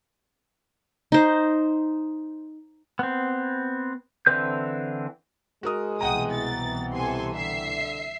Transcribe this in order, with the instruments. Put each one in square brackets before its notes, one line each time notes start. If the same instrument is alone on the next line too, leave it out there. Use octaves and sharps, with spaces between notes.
[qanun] D#4 C5
[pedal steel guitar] B3 C4
D3 E3 C4 B4 G6
[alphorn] G#3 [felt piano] F#4 A#4 D#6
[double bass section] C2 B2 E3 [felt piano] F#5 G5 A#5 [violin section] D#6
[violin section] A6
[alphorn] C3 [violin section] A4 G#5 C6
[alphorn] D3 [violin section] E5 C7